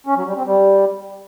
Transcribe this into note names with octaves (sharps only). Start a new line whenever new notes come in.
C#4
F#3
G3
C4
G3